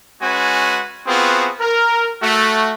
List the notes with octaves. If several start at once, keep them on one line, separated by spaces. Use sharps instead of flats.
G#3 C#4 F#4 B4 G#5
B3 C4 F4 F#4 G#4 B4
A#4
A3 F#4